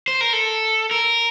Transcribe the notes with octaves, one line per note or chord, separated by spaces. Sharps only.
C5
A#4
A4
A#4